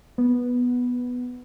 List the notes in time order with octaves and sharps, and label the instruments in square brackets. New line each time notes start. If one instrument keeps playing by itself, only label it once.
[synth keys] B3